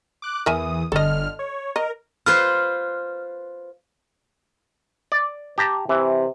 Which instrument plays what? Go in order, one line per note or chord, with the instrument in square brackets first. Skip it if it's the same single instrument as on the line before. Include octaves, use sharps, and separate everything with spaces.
[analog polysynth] D6 F#6
[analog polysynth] E2 E3 D#6 [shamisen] A#4 E5 G#5
[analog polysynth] G1 D3 F6 [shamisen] A4 D#5
[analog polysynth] C#5
[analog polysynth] A#4 [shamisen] D#5
[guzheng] F4 B4 C5 [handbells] F6
[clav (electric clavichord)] D5
G4 A5 A#5
[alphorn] C3 [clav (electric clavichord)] E3